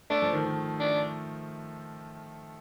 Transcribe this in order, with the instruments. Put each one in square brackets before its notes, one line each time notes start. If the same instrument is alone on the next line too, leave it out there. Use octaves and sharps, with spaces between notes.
[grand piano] A3 [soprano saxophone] D4
[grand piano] F3
D#3
D#3
[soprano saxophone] D4